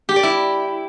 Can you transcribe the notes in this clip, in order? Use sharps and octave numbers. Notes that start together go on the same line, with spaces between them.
G4
D5
E4